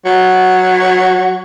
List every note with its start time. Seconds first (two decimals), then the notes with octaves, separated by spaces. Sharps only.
0.05 F#3